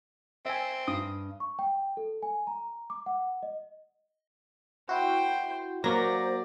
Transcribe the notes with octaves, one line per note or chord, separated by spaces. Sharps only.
C4 E5 G#5
G2 D#6
C#6
G5
A4
G#5
A#5
D6
F#5
D#5
E4 F#4 C5 G5
F#3 A#3 C5 D5 A#6